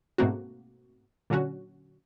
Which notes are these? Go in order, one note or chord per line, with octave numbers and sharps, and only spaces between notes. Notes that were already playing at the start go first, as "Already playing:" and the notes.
G#2 B2 A3 A#3 C4 F#4
A#2 D3 F#3 C#4 F#4